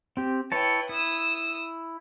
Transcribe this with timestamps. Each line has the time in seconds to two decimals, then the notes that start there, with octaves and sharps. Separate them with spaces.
0.17 C4 G4
0.52 E4 B4 C#5 G5 A5
0.89 E4 D#6 E6